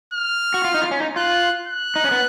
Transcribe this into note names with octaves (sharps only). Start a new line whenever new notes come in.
F6
F#4
F4
D#4
F4
C#4
D#4
F4 F#6
F#6
D#4
C#4
B3